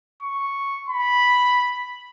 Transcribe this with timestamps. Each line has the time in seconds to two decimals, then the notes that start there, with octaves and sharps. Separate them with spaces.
0.22 C#6
0.89 B5